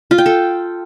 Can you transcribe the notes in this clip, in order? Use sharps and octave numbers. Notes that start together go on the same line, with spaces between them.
F4
G5
A4